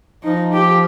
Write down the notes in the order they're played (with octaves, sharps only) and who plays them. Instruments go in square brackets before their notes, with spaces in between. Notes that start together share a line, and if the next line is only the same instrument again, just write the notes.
[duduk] F3 [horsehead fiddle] D#4
[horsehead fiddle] G4